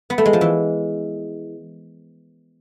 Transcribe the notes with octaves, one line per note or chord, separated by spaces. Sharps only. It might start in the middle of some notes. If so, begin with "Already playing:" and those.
B3
A3
G#3
F3
E3